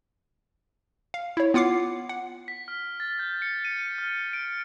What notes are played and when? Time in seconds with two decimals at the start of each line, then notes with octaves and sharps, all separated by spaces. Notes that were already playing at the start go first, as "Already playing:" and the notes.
1.14 F5
1.37 E4 C#5
1.54 B3 F4 F#5 D6 C7
2.09 F#5
2.48 B6
2.68 F6
3.00 A6
3.19 G6
3.42 C#7
3.65 D#7
3.98 F6
4.33 D7